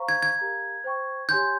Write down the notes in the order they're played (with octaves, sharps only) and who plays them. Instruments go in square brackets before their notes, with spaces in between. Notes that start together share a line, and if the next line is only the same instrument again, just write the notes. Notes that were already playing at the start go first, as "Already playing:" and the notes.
Already playing: [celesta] C5 F5 A#5 C#6
[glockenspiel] G#6
G#6
[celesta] G4 A#4 F5 A#5
C5 G5 C#6
[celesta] G4 C#5 G#5 C6 [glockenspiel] G6